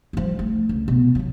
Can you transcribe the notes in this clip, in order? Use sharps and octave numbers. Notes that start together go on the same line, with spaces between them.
F3 G3
A3
C#2
B2
B2 F#3